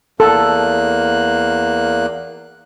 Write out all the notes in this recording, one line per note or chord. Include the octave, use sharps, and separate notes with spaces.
E2 A#3 A4 F#6